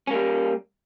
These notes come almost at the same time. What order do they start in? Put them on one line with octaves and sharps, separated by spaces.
C#4 A#3 G3